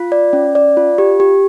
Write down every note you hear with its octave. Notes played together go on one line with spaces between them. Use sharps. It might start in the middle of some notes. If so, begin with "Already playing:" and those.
Already playing: F4
D5
C#4
D5
F4
G4
G4